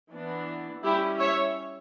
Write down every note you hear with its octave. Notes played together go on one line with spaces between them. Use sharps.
E3 B3 D4
G3 C#4 E4 G4
C#5 E5